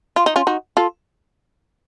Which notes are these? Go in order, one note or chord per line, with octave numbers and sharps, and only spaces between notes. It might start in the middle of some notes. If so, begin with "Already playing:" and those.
F4
D#4
C#4 F4
D#4 F#4
F4 A4